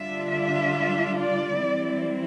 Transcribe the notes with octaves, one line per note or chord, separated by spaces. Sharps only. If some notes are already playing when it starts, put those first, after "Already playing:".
Already playing: D3 G3 D4 F4 E5
E5
D5
E3 G3 C4 E4